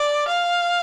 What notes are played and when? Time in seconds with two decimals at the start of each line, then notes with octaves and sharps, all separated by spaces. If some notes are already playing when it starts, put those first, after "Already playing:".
Already playing: D5
0.28 F5